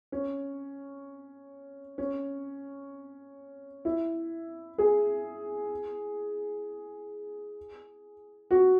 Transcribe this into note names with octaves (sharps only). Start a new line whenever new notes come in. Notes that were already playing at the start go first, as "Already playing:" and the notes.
C#4
C#4
E4
G#4
F#4